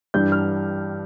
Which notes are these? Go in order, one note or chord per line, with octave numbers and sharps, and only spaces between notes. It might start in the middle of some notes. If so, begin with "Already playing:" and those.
G2 E3 G3 G6
F6